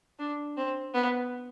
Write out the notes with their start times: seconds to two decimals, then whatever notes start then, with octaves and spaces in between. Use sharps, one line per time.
0.19 D4
0.57 C4
0.94 B3